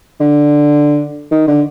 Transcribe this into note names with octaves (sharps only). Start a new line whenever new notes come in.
D3
D#3
D3